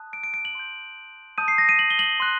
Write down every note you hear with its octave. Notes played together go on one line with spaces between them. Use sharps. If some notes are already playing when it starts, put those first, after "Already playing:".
Already playing: A5 D#6 F#6
D7
D7
D7
F#7
C6 G6
A5 D#6 G6 D#7
C7
A#6
D#7
F#7
G7
F#7
C6 F#6